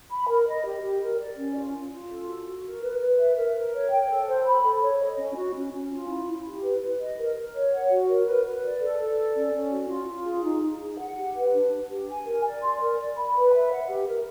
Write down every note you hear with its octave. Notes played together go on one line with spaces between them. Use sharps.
B5
A#4
D#5
G4
G4
A#4
D5
C#4
F4
F4
F4
A4
F#4
F#4
A#4
B4
B4
E5
A#4
A#4
C#5
G5
A4
C5
B5
A4
C#5
D#5
C#4
F#4
C#4
C#4
F4
E4
E4
G4
B4
B4
D#5
A#4
A#4
C#5
F#5
F#4
A#4
B4
B4
D5
A4
A4
D5
C#4
C#4
F#4
F4
F4
G#4
D#4
D#4
G#4
F#5
G4
B4
D4
D4
G4
G#5
A#4
D5
C6
A#4
D5
B5
B4
E5
F#5
G4
A#4